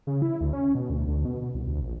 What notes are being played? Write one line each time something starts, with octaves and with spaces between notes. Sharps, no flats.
C#3
E4
D2
C#4
B2
D2
D2
B2
B2
C2
D2
A#1